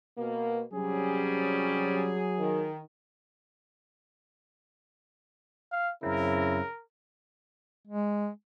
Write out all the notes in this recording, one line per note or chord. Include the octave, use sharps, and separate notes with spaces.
B2 A#3
C3 F#3 G3 C#4 G#4
D#3
F5
F#2 C#3 C4 E4 A#4
G#3